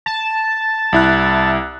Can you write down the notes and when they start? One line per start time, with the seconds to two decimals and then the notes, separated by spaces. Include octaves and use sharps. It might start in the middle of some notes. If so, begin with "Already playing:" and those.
0.06 A5
0.93 C2 E4 F#6